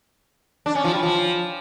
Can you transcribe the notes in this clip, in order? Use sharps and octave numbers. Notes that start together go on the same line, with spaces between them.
D4
C#4
F3
G3
F3